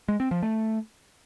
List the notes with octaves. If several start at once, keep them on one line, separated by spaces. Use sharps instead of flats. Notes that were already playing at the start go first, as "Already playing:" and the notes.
G#3
C4
F3
A3